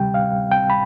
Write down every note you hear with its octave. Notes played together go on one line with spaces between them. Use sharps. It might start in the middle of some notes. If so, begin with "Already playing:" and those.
Already playing: D2 C3 G3 G5
F5
G5
B5